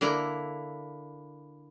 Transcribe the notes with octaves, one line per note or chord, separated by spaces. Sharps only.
D3 A#3 E4 A#5